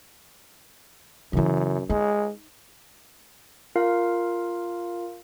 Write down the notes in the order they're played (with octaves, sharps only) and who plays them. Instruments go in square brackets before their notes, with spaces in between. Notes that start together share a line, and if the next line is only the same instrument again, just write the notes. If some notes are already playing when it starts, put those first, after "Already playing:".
[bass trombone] F#2 [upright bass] C#3 E3
[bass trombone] G#3 [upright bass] D#4
[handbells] F4 A#4 F5